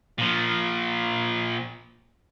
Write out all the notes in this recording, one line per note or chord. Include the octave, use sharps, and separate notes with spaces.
A#2 F3